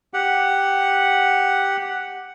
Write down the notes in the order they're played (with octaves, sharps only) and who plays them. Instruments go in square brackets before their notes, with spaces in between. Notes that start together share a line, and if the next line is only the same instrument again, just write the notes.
[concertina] G4 F#5